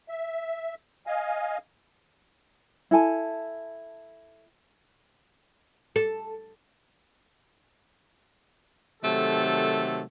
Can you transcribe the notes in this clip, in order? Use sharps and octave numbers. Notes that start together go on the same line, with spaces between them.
E5
D#5 F5 G#5
E4 A4 G#5 A5
A4
C3 D#3 F#3 A3 A4